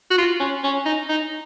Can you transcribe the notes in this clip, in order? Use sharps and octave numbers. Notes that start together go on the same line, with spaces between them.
F#4
F4
C#4
C#4
D#4
D#4